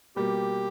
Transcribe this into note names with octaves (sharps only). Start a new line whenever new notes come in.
B2 G3 A#3 G4